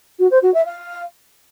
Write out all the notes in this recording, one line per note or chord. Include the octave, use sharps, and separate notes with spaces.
F#4
C5
F#4
E5
F5